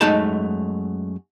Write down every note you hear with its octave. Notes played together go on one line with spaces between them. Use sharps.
F#2 G#3 A3 D#4 A5